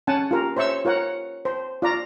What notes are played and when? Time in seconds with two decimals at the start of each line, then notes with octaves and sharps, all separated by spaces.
0.07 C#4 F#5 G#5 A5
0.31 F4 G4 A#4
0.57 C5 C#5 E5 C#6 E6
0.85 F4 A#4 C#5 F#5
1.45 C5
1.82 F4 D5 A#5